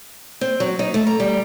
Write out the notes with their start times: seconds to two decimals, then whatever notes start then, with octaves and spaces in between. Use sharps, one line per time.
0.41 C4
0.60 F#3
0.79 D#4
0.94 A3
1.07 A#5
1.20 G3